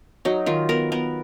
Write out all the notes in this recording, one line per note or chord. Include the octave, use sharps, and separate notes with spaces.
F#3 D#4
D#3 F4
B3 A#4
B3 A#4